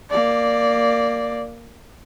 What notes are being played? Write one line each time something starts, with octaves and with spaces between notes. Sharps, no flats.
A#3 D5